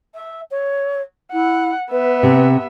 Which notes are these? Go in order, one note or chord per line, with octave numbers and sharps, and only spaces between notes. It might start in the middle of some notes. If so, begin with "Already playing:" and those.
E5
C#5
E4 F#5
B3 B4 E5
C3